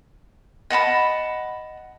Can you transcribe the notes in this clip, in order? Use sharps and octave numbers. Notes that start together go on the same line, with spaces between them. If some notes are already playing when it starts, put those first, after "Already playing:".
D#5 F#5 A5 B5